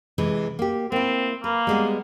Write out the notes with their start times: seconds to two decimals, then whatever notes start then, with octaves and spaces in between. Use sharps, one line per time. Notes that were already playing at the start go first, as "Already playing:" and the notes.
0.18 C3 E3 G#3
0.59 A#3 G4
0.92 A#3 C4 E4
1.44 A#3 B4
1.67 G3 G#3 B3